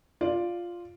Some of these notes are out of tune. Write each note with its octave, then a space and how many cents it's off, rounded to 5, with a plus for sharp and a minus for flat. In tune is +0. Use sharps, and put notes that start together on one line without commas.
F4 +0 D5 +0